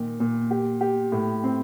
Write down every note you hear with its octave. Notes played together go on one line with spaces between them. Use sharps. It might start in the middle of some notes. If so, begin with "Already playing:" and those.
Already playing: A#2 D#3
A#2
G4
G4
A2
C4